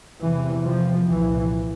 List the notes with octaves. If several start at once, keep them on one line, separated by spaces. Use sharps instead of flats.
E2 C3 E3
F3
C2 A#2 E3